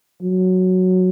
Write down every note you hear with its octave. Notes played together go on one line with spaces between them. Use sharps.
F#3